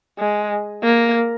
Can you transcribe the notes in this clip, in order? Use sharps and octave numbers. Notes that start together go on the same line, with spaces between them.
G#3
A#3